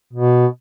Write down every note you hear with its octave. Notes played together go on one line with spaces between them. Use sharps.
B2